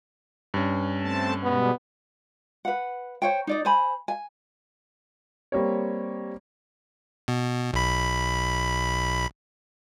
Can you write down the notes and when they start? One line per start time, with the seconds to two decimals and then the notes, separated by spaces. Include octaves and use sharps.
0.54 G2 C#4
1.01 A3 C4 A5
1.43 B2 G3 G#3 B3
2.65 B4 F#5
3.22 C5 C#5 G5
3.47 D#4 D5 D#5
3.65 C5 G#5 B5
4.08 G#5
5.52 G3 A#3 C4 G4 C#5
7.28 B2
7.73 B1 B5